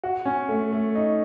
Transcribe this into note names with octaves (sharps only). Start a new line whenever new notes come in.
F#4
C#4
A3
A3
D#4